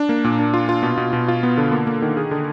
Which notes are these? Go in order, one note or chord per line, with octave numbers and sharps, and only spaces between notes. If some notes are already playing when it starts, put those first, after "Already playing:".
Already playing: D4
A#3
A#2
D4
F4
F4
B2
B2
B2
F4
B3
D3
A#3
A#3
D#3
G#4
D3